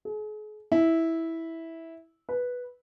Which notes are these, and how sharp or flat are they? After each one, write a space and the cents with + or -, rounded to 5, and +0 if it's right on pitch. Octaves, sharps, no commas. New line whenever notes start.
G#4 +40
E4 -10
B4 -5